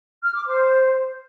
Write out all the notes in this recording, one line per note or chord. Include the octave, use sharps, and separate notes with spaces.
F6
D6
C5